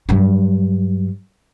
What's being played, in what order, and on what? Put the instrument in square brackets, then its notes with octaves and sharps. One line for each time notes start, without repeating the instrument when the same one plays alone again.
[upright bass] G2 F#3